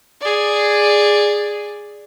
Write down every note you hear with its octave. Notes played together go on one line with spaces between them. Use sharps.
G#4 D5